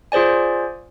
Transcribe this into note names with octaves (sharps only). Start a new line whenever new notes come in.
F4 G#4 C5 D5 G#5